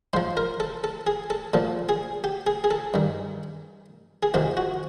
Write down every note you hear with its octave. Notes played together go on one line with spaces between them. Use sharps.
G#2 F3 C5
A#4
A4
A4
G#4
A4
A#2 F3 A4
G#4
G4
G#4
G#4
A4
G2 D#3
G#4
F2 C3 D#3 G4
F#4